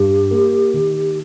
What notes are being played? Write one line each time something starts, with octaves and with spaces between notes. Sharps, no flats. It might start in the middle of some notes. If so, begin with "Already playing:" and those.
Already playing: G2 G4
A#3
D#3